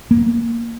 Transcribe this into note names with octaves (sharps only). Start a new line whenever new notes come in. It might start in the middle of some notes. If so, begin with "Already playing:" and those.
A#3